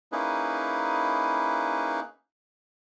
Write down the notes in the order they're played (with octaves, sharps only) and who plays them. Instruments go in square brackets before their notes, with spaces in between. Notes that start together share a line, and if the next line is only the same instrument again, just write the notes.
[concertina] A#3 C#4 D#4 E4 G#4 B4